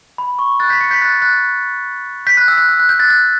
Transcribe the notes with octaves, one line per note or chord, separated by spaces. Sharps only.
B5
C#6
F#6 A6
G6 B6
A6 C#7
G6 B6
F#6 A6
F#6 A6
G6 B6
F#6
E6
F#6
E6
F#6
G6
F#6 A6
F#6